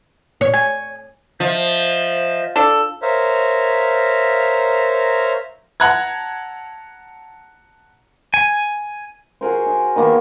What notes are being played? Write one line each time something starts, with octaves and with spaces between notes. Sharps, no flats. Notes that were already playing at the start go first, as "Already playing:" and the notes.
C#5
G#5
F3 C5 D#5 E5
D4 A4
A#4 C5 C#5 E5 F5 A#5
F#5 A5 A#5 F#6 G#6
G#5
F#4 G#4 A#4 C5
D#4
D#3 A#3 B3